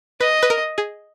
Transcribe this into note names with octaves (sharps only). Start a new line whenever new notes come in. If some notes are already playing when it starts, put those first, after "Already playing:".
B4 D#5
B4
A#4
G#4